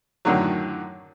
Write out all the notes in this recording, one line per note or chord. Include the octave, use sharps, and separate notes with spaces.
F#2 A2 D3 D#3 F#3